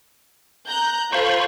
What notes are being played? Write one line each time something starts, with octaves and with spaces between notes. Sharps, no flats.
A#5 F#6 G6
F4 A4 C5 B5 C#6